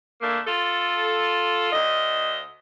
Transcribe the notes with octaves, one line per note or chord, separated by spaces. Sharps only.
D3 A3 A#3
F4 A4
D2 D#5